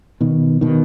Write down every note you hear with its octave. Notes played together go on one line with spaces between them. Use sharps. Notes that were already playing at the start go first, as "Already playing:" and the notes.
B2 D#3
B2 D#3